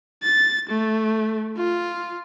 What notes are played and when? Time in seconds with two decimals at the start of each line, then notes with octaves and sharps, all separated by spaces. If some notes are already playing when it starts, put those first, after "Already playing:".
0.23 A6
0.69 A3
1.57 F4